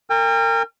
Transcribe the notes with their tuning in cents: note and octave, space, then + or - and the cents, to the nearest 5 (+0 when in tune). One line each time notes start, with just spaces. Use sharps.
A#4 -30 G5 +40